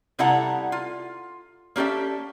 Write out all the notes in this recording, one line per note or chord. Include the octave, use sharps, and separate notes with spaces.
C3 G3 E4 A4 F#5 A#5
F4
A#3 C#4 G4 A4 E5